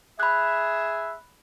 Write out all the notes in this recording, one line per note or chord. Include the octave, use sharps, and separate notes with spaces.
G#4 E5 B5 F#6